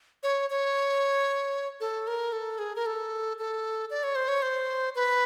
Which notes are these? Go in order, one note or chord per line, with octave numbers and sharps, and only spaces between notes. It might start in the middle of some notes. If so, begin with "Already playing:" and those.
C#5
C#5
A4
A#4
A4
G#4
A#4
A4
A4
D5
C#5
C5
C#5
C5
B4